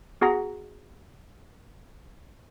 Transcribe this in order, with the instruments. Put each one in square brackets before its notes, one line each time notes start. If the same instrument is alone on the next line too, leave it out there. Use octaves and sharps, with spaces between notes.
[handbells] B3 F#4 G#4 F#5 A#5 A#6